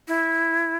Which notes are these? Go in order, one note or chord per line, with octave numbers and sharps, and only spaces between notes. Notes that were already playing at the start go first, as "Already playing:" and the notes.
E4